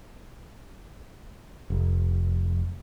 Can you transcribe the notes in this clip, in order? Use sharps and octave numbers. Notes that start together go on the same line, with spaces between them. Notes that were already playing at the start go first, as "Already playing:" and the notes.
F1